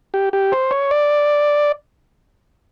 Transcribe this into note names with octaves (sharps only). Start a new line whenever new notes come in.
G4
G4
C5
C#5
D5